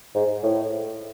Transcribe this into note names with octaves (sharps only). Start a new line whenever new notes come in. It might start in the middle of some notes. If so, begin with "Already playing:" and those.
G#2
A2